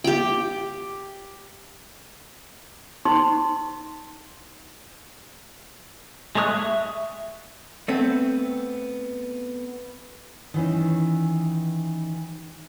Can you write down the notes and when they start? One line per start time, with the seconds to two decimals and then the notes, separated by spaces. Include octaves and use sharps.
0.04 G4 G5
3.05 D#4 C6
6.35 G#3 A3 C#5 D#6 F#6
6.54 E5
7.88 A3 B3 C4
10.54 D#3 E3 C#4